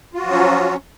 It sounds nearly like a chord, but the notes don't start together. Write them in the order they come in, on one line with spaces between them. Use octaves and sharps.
F4 F#4 F3 F#3 C#4